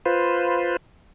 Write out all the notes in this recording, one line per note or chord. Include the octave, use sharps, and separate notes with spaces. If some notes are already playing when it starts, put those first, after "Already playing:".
F4 B4 C5